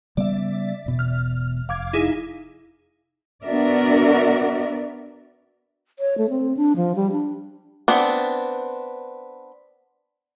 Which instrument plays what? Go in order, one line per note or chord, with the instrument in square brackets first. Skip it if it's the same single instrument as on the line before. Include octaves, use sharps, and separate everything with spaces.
[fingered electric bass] C#3 G3 B3 [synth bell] D5 E5
[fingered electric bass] E1 B2
[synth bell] F6
[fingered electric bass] F1 [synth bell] F5 D6 G#6
[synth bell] D#4 E4 G#4
[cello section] B3 D4 F#4 A#4 D5 E5
[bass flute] C#5
A3
C4
D4
F3
G3
D4
[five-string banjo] B3 C4 D4